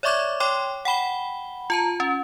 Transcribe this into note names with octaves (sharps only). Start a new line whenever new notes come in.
C#5 D5 E5 C#6 D6 G#6
C#5 G5 C6 D6
F#5 G5 B5 G7
F4 A5 A#5
C#4